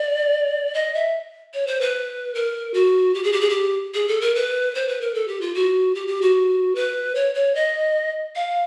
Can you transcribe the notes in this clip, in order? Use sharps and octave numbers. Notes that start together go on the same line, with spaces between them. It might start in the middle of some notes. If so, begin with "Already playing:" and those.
Already playing: D5
D#5
E5
C#5
C5
B4
A#4
F#4
G4
G#4
G4
G#4
G4
G#4
A4
A#4
B4
C5
B4
A#4
A4
G4
F4
F#4
G4
G4
F#4
B4
C#5
C#5
D#5
F5